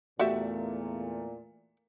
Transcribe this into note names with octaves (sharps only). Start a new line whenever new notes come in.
E2 A#2 A3 F#4 G4 E5